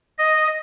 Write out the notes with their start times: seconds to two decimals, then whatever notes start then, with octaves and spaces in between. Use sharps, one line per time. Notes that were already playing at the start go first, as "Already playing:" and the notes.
0.18 D#5